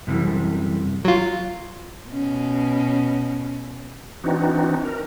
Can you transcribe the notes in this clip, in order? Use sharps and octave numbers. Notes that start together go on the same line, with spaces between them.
F#2 C3 E3 G3
F#3 F4
B2 C#4
E3 C4 D4 D#4 F#4
A#4